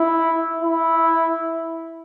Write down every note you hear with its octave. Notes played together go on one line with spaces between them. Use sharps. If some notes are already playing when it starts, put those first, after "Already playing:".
Already playing: E4
E4